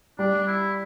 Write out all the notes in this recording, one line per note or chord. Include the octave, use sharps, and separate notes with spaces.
G3 D4
E4